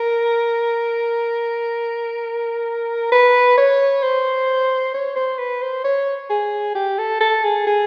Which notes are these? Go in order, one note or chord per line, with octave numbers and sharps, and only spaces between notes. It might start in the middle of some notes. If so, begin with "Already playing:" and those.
Already playing: A#4
B4
C#5
C5
C#5
C5
B4
C5
C#5
G#4
G4
A4
A4
G#4
G#4